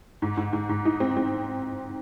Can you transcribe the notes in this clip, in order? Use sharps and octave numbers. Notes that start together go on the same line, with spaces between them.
G#2
G#2
G#2
G#2
D#4
C4
C4